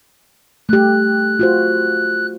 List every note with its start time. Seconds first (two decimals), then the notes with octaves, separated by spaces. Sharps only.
0.69 A3 G4 F#6
1.39 F4 F#4 C5